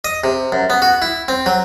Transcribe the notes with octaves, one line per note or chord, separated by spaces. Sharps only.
D#5
C3
F#2
B3
F#4
E4
C4
F#3